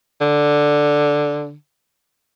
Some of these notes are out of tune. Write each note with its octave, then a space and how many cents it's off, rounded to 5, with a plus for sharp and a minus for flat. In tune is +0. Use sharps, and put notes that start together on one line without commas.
D3 +0